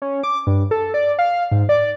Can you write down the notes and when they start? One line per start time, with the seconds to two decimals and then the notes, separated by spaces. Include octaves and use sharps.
0.02 C#4
0.23 D6
0.47 G2
0.71 A4
0.94 D5
1.19 F5
1.52 G#2
1.69 D5